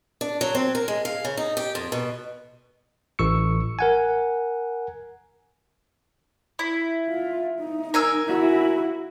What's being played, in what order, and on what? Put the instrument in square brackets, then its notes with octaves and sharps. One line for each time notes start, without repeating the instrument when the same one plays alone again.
[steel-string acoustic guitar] D4
F#3
C4
A#4
G#3
F5
C#3
D#4
G4
F2
B2
[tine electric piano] A1 C#6 E6 C#7
A#4 F#5 G#5
[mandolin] E4
[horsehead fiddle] F4
D#4
[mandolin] A#4 G#5 E6
[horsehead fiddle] E4 F#4